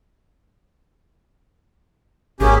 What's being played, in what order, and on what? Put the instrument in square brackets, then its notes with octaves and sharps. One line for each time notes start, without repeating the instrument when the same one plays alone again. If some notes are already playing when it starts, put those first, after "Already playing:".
[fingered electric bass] G#1 [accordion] A#3 C#4 G4 [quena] G#4